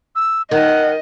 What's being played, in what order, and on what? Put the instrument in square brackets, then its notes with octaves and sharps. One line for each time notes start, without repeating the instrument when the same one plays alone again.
[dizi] E6
[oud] D#3 [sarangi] D#5 [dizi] F#5